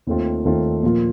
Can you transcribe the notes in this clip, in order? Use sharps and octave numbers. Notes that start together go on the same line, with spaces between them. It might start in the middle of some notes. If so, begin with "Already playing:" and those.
D#2 D#3 A3 C4 F4
D#2 D#3 A3 C4 F4
A#2 F3 A#3 F4